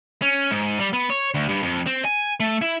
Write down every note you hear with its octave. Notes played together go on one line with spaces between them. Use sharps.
C#4
G#2
G3
B3
C#5
D2
G2
F2
C4
G#5
A3
E4